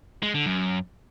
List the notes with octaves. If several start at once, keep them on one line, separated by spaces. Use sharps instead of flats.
G#3
D3
F#2